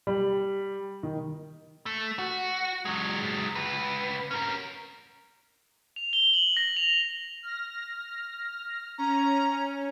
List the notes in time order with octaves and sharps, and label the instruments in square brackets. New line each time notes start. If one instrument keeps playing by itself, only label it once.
[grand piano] G3
D#3
[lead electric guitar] A3
F#4
F#3 G#3
C#2 B4
C#4 A#4
[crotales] F7
G7
F#7
A#6
F7
[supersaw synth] F6 A#6
[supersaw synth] C#4 [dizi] A#5